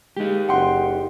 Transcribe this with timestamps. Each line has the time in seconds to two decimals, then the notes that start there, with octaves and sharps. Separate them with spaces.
0.17 G#3 D#4 G4
0.49 F#1 F#5 G5 C6